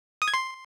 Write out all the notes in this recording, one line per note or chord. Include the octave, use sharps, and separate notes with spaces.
D#6
G#6
C6